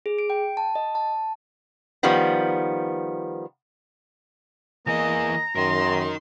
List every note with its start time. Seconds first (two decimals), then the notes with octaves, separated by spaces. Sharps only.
0.06 G#4
0.19 D7
0.30 G5
0.57 A5
0.75 D#5
0.95 A5
2.03 D#3 F3 G3 B3
4.87 E3 A#3 G#4 D#5 A#5
5.55 F#2 D#4 A#4 C6